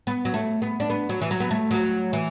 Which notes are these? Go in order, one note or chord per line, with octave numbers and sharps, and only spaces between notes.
B3
F#3
A3
B3
D4
B3
F#3
E3
F#3
B3
A3
F#3
E3